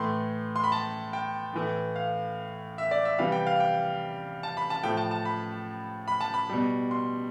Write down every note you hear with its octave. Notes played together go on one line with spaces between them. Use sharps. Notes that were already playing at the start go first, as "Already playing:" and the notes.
Already playing: A2 E3 A3 C6
C6
B5
A5
G5
A2 E3 A3
F5
E5
D5
E5
C3 E3 G3 F5
G5
F5
G5
A5
B5
A5
A2 F3 A3 G5
A5
A5
B5
B5
A5
B5
B2 G3
C6